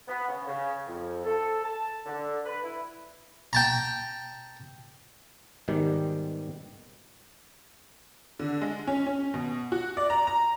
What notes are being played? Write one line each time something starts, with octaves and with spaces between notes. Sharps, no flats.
B3
C#3
C#3
F2
A4
A5
D3
B4
E4
G5 A5 A#5
G#2 B2 D#3 G3 G#3 G4
D3
G#3
C#4
C#4
B2
F#4
D5
A#5
A#5